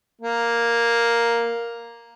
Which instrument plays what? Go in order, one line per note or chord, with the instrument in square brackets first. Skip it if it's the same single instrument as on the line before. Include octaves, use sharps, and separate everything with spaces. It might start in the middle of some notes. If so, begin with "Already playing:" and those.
[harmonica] A#3